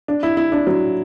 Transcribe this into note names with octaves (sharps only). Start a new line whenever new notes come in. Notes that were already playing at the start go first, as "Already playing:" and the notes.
D4
E4
E4
D4
F#3